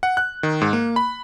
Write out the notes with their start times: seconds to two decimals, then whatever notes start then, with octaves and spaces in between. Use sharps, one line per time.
0.03 F#5
0.17 F#6
0.43 D#3
0.61 G#2
0.73 A#3
0.96 B5